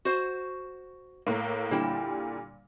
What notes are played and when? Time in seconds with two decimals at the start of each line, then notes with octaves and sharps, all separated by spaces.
0.05 F#4 C5
1.27 A2 A#3
1.71 A#2 D3 G3 A#3 E4 G5